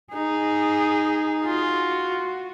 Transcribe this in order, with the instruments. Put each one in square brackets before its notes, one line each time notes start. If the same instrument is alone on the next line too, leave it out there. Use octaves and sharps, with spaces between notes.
[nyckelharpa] D#4 [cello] G#4
[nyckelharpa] F4 [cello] F#4